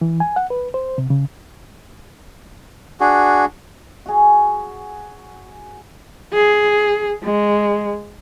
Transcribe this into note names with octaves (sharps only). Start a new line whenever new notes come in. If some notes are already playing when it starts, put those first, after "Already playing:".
E3
G#5
F#5
B4
C5
C3
C#3
D4 F#4 G#4
F#4 G#4
G#4
G#3